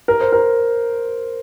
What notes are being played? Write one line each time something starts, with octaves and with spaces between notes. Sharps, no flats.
A#4
C5
A#4